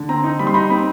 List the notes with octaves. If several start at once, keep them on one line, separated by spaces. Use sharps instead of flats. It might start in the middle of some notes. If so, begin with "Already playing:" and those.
Already playing: D3
C4 A#5
D#4
G3 B5
C6
D#4 B5
C4 B5